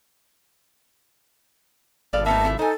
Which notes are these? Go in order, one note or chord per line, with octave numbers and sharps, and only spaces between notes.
G#1 B2 A4 D5 F5
A#3 B3 D#4 E5 A5
C3 A3 E4
D#4 A4 C5 G#5